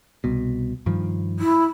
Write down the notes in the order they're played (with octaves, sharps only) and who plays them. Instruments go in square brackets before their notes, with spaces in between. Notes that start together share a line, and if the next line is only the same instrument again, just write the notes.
[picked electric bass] C2 B2
G2 D#3 F3
[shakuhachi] E4